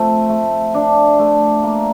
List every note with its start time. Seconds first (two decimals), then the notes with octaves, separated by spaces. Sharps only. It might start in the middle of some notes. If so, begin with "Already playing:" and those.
Already playing: F3 A3 C4
0.29 A3
0.74 D4
1.19 A3
1.63 A#3